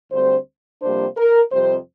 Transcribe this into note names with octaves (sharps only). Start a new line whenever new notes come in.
D2 D3 G3 C4 C5
F2 C3 G3 A#3 D4 C5
A#4
F2 C3 G3 C4 C5